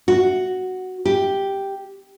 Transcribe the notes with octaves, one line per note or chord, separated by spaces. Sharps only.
F#4
G4